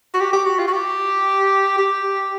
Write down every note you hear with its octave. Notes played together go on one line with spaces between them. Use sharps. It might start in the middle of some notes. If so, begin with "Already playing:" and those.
F#4
G4
G4
F#4
F4
F#4
G4
G4